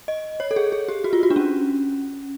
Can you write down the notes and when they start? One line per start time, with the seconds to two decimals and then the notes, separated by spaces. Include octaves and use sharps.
0.08 D#5
0.40 C#5
0.51 A4
0.56 G#4
0.72 G#4
0.88 G4
1.04 F#4
1.13 F4
1.23 F#4
1.30 D4
1.36 C#4